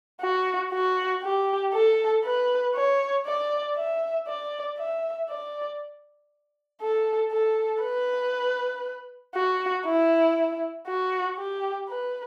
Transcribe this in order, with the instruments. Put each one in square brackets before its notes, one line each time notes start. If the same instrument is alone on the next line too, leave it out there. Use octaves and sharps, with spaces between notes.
[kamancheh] F#4
F#4
G4
A4
B4
C#5
D5
E5
D5
E5
D5
A4
A4
B4
F#4
E4
F#4
G4
B4